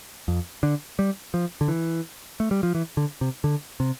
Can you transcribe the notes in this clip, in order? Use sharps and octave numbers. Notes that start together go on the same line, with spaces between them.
F2
D3
G3
F3
D3
E3
A3
G3
F3
E3
D3
C3
D3
C3